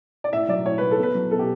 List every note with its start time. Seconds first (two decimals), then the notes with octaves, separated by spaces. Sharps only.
0.24 D5
0.33 A2 E5
0.48 F#3 D5
0.65 A2 C#5
0.78 F#3 B4
0.91 A4
0.98 B2 B4
1.15 F#3
1.31 B2 A4
1.39 G4